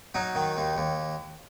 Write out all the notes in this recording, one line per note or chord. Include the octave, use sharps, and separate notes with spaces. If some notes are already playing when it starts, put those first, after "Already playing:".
F#3 D#4
D#3
D#2
D#2